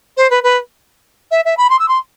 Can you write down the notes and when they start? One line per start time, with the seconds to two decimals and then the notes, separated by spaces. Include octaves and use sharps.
0.17 C5
0.30 B4
0.43 B4
1.31 E5
1.45 E5
1.57 B5
1.70 C6
1.79 E6
1.88 C6